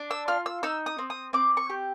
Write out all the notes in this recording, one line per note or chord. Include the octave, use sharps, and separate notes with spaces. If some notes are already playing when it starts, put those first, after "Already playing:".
Already playing: D4
E6
F4 F6
E6
D#4 E6
D#6
C4
D#6
C4 D6
C#6
G4